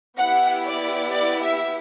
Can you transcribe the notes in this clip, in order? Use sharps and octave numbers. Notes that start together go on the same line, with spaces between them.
B3 E4 G4 F#5
D5
D5
E5